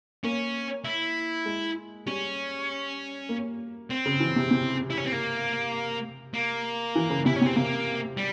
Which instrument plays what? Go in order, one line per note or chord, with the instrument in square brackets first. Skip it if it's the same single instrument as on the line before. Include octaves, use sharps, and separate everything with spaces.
[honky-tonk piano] A#3 [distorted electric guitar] C#4
[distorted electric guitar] E4
[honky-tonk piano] G#3
[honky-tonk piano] G3 [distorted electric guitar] C#4
[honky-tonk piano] A#3
[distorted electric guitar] C4
[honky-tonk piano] C#3
E3
C3
C3
[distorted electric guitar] E4
C#4
C4
A#3
A#3
[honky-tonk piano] E3
C#3
[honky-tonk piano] C3 [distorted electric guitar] E4
[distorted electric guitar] C#4
[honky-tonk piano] C3 [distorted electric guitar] C4
[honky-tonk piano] C3 [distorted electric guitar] A#3
[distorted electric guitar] G3